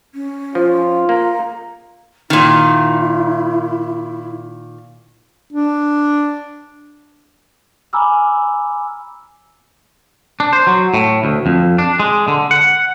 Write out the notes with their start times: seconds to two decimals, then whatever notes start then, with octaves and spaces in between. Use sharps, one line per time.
0.15 C#4
0.55 F3 F4
1.09 A#3 A#5
2.30 A#2 D#3 E4
5.53 D4
7.93 G#5 A#5 B5 D6 E6 F6
10.40 D4
10.53 C5
10.67 F#3
10.94 A2
11.24 D2
11.46 F2
11.78 D4
12.00 G#3
12.28 D3
12.51 F#5